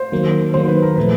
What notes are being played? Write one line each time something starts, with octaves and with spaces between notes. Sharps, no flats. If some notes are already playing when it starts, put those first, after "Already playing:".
Already playing: C5
D#3 F#3 A#3
D#3 F#3 A#3 C5
B4
A#4
A#2 F3 A3 B4